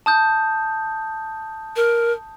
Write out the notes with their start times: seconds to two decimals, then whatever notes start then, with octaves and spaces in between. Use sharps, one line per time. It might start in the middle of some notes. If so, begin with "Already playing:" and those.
0.06 A5 D#6 G6
1.76 A#4